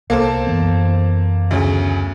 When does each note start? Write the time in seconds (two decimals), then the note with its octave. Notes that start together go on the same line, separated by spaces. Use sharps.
0.10 C2 A#3 A4 C5
0.47 F#2 E3 B3
1.51 D2 C#3